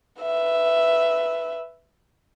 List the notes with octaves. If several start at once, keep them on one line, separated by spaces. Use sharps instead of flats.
B4 E5